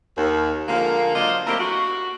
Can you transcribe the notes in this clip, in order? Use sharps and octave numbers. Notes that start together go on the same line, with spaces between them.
D#2
D3 F3 G#3 A#3
F#3 A#3 D4 F4 C5 D#5
A3 A#3 C4 E4 G4 A#4
F#4